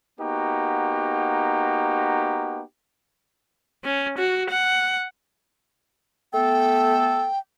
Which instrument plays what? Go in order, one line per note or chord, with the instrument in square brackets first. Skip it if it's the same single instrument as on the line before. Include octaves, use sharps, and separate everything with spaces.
[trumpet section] A#3 B3 D#4 F#4 G4
[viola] C#4
F#4
F#5
[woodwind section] A3 B3 A4 [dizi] G5